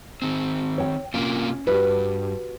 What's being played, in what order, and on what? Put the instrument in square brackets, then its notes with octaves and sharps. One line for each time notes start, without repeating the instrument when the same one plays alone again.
[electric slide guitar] D#3 C4
[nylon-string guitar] C#5 G5
[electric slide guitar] C3 A#3 F4 [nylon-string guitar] C#4
[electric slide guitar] G2 [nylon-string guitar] F#4 G4 B4